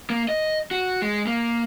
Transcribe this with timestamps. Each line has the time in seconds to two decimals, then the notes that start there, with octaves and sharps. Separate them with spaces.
0.10 A#3
0.29 D#5
0.71 F#4
1.02 G#3
1.27 A#3